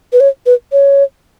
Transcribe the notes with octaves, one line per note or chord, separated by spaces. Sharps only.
B4
C#5
B4
C#5